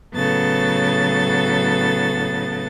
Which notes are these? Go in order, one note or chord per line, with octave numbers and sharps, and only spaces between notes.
A2 C#3 F#3 B3 A4 A6